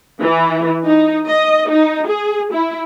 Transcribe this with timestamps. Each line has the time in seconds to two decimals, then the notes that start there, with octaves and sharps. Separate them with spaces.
0.21 E3
0.85 D#4
1.28 D#5
1.69 D#4
2.08 G#4
2.53 E4